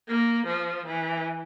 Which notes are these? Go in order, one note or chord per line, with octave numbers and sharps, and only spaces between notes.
A#3
F3
E3